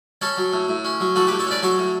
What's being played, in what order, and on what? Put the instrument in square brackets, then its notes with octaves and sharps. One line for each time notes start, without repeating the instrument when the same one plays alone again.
[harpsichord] C#4 A4 C#5
F#3
A2
A2
C#4
F#3
A2 F#4 A4
G4 B4
A2
A4 C#5
C#4 B4 D5
F#3 A4 C#5
A2